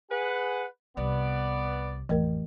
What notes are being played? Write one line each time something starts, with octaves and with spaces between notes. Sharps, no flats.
G#4 B4 F#5
C2 B3 D5
A1 F2 E3 A3 A#4